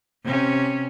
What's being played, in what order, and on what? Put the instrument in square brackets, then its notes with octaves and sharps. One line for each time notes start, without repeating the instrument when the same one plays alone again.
[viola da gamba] C3 C#4